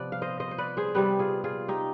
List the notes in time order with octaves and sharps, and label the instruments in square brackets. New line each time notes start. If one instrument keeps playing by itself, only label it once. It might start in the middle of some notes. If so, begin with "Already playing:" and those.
Already playing: [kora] C3 F3 B3 B4 D5
F5
C5 D#5
C5 D#5
C5
B4 D5
G#4 C5
C3 G3 B3 G4 B4
F4 G#4
F4 G#4
D#4 G4